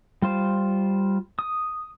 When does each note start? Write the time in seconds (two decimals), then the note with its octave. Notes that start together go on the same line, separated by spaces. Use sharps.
0.22 G3 F4 C5
1.39 D#6